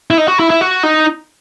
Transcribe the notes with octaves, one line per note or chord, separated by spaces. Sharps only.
E4
D#4
F#4
E4
E4
F#4
D#4